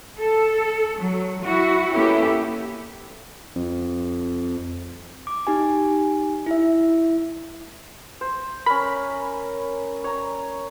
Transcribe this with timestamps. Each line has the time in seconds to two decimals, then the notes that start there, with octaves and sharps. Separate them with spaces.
0.20 A4
0.98 F#3
1.42 E4 F#4
1.93 A#3 B3 C#4 E4 G4 A4
3.56 F2
5.27 D6
5.47 D#4 G4 G#5
6.46 E4 E5
8.21 C5
8.66 C#4 A#4 B5
10.04 C#5 A#5